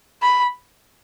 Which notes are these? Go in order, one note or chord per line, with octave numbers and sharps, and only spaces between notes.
B5